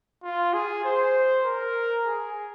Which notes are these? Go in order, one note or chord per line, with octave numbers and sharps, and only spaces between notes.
F4
G#4
C5
A#4
G#4